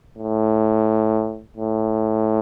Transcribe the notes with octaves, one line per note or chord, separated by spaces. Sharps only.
A2
A2